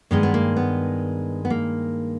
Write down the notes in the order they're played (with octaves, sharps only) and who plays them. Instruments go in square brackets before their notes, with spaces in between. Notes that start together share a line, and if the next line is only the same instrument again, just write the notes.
[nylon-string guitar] G2 D#3 G#3 B3
B3
A#3
B3
B3
A#3